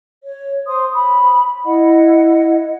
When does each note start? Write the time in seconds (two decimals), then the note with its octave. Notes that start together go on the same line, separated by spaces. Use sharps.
0.23 C#5
0.67 C5 C6 D#6
0.94 B5
1.65 E4 D#5 F#5